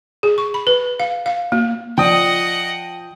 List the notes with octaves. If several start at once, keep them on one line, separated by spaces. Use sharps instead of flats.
G#4
C#6
B5
B4
F5
F5
A#3
F3 F4 D5 D#5 F#5 G5 D#6